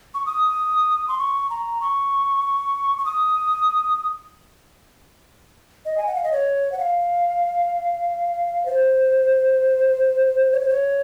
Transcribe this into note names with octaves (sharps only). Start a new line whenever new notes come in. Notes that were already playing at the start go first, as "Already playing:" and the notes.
C#6
D#6
C6
C#6
A#5
C#6
C#6
D#6
D#5
G#5
F#5
F5
D#5
C#5
F#5
F5
C5
C#5
C5
C#5